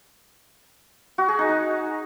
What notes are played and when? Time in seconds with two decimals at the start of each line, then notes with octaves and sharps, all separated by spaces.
1.18 F#4
1.28 G#4
1.39 D#4
1.49 D#4